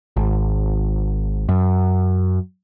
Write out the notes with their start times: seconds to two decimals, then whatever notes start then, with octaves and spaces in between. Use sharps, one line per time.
0.16 G#1
1.49 F#2